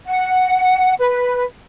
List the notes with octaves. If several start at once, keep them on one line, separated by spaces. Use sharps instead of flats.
F#5
B4